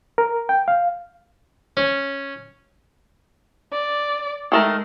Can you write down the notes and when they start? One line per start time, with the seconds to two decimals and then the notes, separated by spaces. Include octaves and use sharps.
0.18 A#4
0.49 G5
0.68 F5
1.77 C#4
3.72 D5
4.52 D#3 G#3 A3 A#4